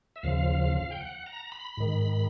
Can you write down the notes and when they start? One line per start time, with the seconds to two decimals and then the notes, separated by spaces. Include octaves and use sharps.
0.16 E5
0.23 D#2 C#3 F3 F5
0.91 G5
1.01 F#5
1.26 A#5
1.52 B5
1.77 G#2 D#3